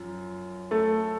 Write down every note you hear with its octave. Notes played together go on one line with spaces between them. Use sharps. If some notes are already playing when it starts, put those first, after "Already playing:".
Already playing: F#2 F3
A3 A4